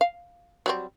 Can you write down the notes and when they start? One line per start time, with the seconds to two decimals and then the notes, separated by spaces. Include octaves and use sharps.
0.01 F5
0.66 F#3 G3 C4